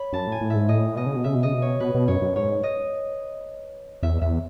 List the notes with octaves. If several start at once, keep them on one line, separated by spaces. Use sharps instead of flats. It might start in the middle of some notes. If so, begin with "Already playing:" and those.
Already playing: C#5 B5
F#2 A5
A2 G#5
A2
E5
G#2
A2 D#5
B2 D#5
C#3
B2
C#3 E5
B2
C#3 D#5
B2
C#5
B2 B4
B2
F#2 C#5
F#2
G#2 C#5
D#5
E2 E5
E2 E5